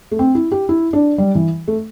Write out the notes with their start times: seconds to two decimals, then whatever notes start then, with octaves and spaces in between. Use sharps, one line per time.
0.11 A3
0.19 C4
0.35 E4
0.52 G4
0.69 E4
0.93 D4
1.18 G3
1.35 E3
1.68 A3